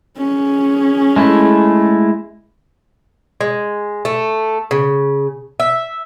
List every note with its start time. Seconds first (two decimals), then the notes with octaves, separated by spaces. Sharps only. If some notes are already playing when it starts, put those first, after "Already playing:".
0.18 C#4 G#4
1.16 G#3 A3 E4
3.41 G#3
4.05 A3
4.71 C#3
5.60 E5